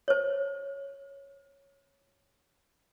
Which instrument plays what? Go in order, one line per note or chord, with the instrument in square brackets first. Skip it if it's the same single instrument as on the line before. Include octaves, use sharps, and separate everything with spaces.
[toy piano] C5 C#5